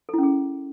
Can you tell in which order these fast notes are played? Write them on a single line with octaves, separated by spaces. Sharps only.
A4 E4 C#4 G#4